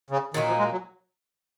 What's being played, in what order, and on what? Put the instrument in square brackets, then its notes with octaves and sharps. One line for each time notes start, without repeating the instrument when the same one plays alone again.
[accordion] C#3
[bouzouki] A#2 F#3 A#3 D#4 [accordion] D#3
[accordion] F3
G#3
F#3